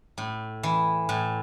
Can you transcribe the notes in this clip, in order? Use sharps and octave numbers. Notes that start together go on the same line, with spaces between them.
A2
E3
A2